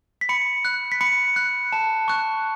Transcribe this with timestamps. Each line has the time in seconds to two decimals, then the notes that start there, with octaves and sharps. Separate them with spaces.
0.21 B6
0.29 B5 C#7
0.65 F#6
0.92 B6
1.01 B5 C#7
1.36 F#6
1.73 A5
2.08 C#6 F#6